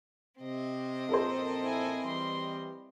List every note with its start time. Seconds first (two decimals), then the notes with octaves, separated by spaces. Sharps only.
0.41 C3 C4 D#5
1.09 A#1 F#2 F4 A4 A#4 C5
1.63 E4 G#5
2.05 E3 G3 C6